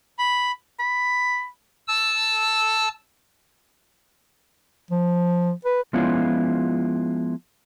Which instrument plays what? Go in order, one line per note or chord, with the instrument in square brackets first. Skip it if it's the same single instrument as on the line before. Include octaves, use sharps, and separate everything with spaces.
[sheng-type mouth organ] B5
[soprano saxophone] B5
[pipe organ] A5 E6
[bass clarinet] F3
B4
[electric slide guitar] F3 G#3 B3 C#4 E4 F4